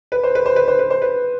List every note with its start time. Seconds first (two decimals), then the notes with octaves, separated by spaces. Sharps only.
0.12 B4
0.23 C5
0.35 B4
0.46 C5
0.56 B4
0.68 C5
0.79 B4
0.90 C5
1.02 B4